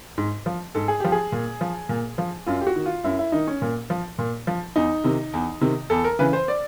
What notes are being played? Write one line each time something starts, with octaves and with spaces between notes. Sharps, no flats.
G#2
F3
G#2 A4
G#4
F3 G4
G#4
A#2
F3
A#2
F3
F#2 F4
G4
F#4
D#3
F4
F#2 E4
E4
D#3 D#4
C#4
A#2
F3
A#2
F3
E2 D#4
C3 D#3
E2
C3 D#3
E2 A4
A#4
C#3 E3 B4
C5
D5